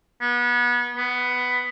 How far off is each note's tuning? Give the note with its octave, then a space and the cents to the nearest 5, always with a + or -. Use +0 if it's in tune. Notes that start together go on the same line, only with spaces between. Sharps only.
B3 -30
B3 +10